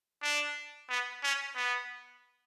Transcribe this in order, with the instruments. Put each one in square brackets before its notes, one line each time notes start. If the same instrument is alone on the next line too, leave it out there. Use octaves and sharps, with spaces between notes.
[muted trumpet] D4
B3
C#4
B3